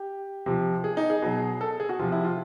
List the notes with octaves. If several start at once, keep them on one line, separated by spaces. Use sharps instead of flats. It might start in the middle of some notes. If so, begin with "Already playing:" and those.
Already playing: G4
C3 F3
G#4
D#4
G#4
B2 F#3
A4
G#4
F#4
C3 F3 F4
E4
F4